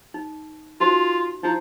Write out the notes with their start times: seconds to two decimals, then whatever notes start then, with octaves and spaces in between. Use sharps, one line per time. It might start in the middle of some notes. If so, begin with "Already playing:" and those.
0.14 D#4
0.81 D#4 F4 F#4 C5
1.43 F3 D#4 E4